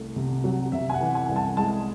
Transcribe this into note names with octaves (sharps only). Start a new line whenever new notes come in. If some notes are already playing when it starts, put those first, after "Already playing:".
Already playing: C2 A3
C3
F#3
C3 E5
G#5
F#5
E3
G#5
C2
A5
G#3 A5